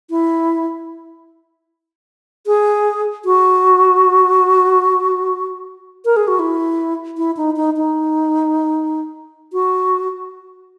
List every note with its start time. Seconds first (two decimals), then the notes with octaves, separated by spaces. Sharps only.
0.10 E4
2.47 G#4
3.25 F#4
6.05 A#4
6.16 G#4
6.28 F#4
6.39 E4
7.17 E4
7.37 D#4
7.56 D#4
7.77 D#4
9.53 F#4